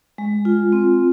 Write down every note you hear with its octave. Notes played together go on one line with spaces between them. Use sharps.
G#3
F4
C4